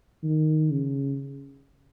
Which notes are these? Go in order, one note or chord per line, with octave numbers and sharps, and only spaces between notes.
D#3
C#3